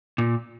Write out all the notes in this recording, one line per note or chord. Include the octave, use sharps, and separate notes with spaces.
A#2